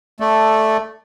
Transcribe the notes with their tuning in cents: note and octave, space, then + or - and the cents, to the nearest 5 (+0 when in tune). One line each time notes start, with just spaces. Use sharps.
A3 +0 A4 +0 D5 +0